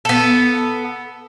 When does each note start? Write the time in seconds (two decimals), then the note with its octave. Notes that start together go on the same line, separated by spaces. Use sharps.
0.05 B3 A4